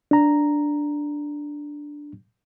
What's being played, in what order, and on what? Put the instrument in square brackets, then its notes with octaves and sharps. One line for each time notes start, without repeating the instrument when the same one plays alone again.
[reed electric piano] D4 A#5